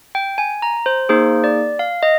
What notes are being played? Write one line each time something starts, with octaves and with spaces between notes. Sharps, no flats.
G5
G#5
A#5
C5
A#3 D#4 G#4 C5
D5
F5
D#5